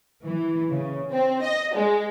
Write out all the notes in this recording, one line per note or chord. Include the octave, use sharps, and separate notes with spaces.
E3
C#3
C4
D#5
G#3